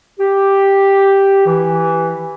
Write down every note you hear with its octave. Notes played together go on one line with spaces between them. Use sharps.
G4
E3